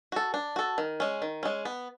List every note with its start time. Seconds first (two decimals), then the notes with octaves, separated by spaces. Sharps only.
0.12 F#4 A4
0.34 D4
0.56 F#4 A4
0.78 D#3
1.00 G#3 C#4
1.22 D#3
1.43 G#3 C#4
1.65 B3